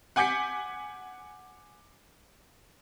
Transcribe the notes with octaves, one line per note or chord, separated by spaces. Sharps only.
F#5 G#5 D6 G6 B6 C#7